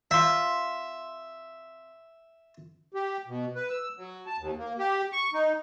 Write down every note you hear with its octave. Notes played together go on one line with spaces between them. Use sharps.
C3 F4 E5
G4
B2
B4
E6
F#3
A5
D#2
A#3
G4
C#6
D#4